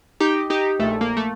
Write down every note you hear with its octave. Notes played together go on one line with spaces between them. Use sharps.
D#4 G4
D#4 G4
A#1 A#2 A3
A#3
A3